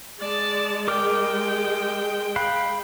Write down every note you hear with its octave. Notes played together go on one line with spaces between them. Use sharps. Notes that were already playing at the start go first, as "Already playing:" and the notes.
G#3 D5 A5
A#4 G5 D6 F6
F5 B5 F#6